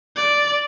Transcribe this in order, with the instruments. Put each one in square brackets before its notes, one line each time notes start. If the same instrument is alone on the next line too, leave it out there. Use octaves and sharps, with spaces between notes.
[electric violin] D5